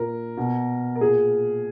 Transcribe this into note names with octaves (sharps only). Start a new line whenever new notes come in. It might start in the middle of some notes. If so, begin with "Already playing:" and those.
Already playing: A#2 A#4
B2
A#4
A#2 G#4